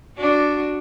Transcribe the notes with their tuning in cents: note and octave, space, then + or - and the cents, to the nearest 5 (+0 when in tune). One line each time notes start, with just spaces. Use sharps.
D4 +0 F#4 -5